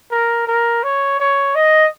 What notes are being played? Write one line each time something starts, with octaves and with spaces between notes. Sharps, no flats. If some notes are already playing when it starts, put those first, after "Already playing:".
A#4
A#4
C#5
C#5
D#5